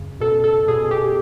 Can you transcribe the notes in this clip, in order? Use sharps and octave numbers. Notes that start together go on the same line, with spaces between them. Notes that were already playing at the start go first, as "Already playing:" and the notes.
Already playing: F#2 C#3
B2 A4
A4
B2 G#4
G4